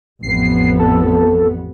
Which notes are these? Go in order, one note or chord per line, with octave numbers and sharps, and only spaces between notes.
A1 F2 B3 C7
A4